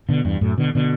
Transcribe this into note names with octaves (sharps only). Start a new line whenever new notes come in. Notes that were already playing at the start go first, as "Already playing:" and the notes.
B2 D3
E2 G2
F#2 A2
B2 D3
B2 D3